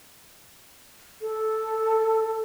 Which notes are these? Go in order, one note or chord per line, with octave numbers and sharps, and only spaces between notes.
A4